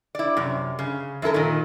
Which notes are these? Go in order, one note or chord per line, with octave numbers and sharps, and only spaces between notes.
E4 D5
F#2 C3
C#3
F#2 E4 A4 A#4
A#2 D#3